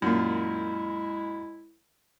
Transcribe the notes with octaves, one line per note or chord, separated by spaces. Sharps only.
F#2 A#2 G#3 E4